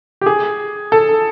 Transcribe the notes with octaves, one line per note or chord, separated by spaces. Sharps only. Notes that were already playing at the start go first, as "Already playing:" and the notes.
G4
G#4
A4